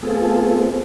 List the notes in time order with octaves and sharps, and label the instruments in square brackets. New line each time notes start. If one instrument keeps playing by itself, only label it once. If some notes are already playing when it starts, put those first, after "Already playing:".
[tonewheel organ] A3 B3 C4 F4 G#4 A4